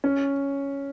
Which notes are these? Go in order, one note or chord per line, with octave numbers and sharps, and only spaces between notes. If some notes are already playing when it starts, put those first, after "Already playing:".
C#4